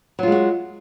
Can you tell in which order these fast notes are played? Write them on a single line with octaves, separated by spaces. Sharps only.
F#3 F4 G#3 F#4